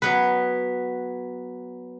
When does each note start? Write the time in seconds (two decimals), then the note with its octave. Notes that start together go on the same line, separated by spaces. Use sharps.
0.02 F#3 B3 B4